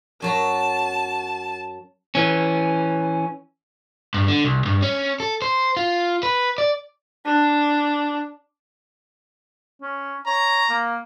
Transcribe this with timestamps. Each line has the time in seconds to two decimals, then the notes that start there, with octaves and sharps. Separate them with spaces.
0.22 F#2 F#3 A5 A#5
2.15 E3 C#4
4.14 G2
4.28 D3
4.44 C2
4.66 G2
4.82 C#4
5.20 A4
5.42 C5
5.77 F4
6.23 B4
6.58 D5
7.25 D4
9.82 C#4
10.27 C#5 A#5
10.70 A#3